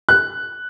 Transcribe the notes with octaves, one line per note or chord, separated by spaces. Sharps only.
F#6